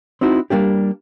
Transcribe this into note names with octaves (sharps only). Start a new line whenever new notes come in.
C4 D#4 E4 F#4
G3 A#3 D4 G4